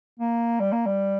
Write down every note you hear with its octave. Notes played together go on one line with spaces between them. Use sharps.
A#3
G3
A#3
G3